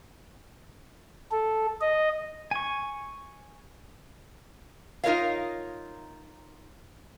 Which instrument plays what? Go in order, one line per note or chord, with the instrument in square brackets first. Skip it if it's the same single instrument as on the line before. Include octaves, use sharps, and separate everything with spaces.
[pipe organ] A4
D#5
[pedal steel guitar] G#5 C#6
[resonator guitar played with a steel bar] D#4 F4 A#4 C#5 D#5 F5